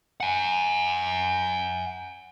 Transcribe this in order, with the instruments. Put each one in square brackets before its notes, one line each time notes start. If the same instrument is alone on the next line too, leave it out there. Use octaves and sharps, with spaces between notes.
[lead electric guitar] F#5 G#5